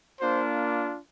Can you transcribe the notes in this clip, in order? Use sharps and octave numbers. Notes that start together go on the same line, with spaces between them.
A#3 D4 F4 C5